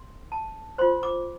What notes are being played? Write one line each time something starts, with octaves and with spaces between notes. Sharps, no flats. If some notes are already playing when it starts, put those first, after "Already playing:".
Already playing: C6
A5
F4 C5 C6
D6